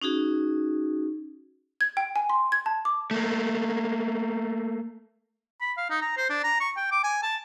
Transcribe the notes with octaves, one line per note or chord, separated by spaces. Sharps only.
C#4 D#4 F#4 G#4
G#6
G5
G#5
C6
G#6
A5
D6
A3 A#3
B5
F5
D#4
A#5
C5
D4
A#5
C#6
G5
D6
G#5
A5